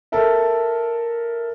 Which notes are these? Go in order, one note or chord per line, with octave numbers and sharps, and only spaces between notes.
A4 A#4 E5